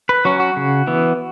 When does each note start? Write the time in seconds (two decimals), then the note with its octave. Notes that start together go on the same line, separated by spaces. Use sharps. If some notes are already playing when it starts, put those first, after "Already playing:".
0.09 B4
0.25 F#3 C#4 F#4
0.40 F#4
0.57 C#3
0.87 E3 B3